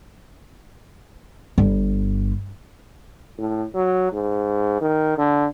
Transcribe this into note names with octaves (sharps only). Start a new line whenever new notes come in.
G1
A2
F#3
G#2
D#3
D3